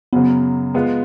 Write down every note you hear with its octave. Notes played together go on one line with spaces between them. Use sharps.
F#2 C#3 F#3 B3
G#3 B3 F4